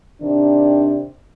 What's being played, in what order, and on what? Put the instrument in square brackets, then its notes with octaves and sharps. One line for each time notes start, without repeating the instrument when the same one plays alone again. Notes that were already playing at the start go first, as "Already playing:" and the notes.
[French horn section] C3 D#3 D4